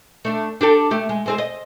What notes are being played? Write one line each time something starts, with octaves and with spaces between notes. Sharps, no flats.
A3 D4
D4 G4 A4
A3 G4
G#3
G#3 C4 G#4
D#5